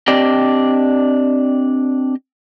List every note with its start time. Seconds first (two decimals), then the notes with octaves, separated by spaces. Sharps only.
0.08 C4 D4 G4 D5 D#5 G5